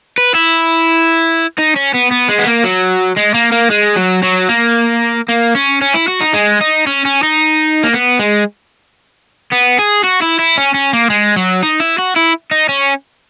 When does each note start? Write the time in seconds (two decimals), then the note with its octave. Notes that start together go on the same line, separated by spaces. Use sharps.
0.18 B4
0.35 E4
1.58 D#4
1.76 C#4
1.94 B3
2.11 B3
2.28 G#3
2.38 B3
2.47 A#3
2.64 F#3
3.17 G#3
3.34 A#3
3.52 A#3
3.70 G#3
3.96 F#3
4.23 F#3
4.49 A#3
5.28 A#3
5.55 C#4
5.82 C#4
5.94 E4
6.08 F#4
6.21 D#4
6.34 G#3
6.61 D#4
6.87 C#4
7.05 C#4
7.23 D#4
7.83 A#3
7.93 B3
8.19 G#3
9.52 B3
9.78 G#4
10.04 F#4
10.22 E4
10.39 E4
10.57 C#4
10.74 C#4
10.93 A#3
11.10 G#3
11.36 F#3
11.63 D#4
11.80 E4
11.99 F#4
12.16 E4
12.51 D#4
12.69 C#4